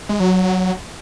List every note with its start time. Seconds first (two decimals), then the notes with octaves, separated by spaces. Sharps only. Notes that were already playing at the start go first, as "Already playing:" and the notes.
0.09 G#3
0.20 F#3